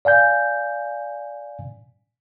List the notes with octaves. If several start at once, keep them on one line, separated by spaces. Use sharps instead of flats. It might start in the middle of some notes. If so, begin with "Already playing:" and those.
D5 F5 G#5 G6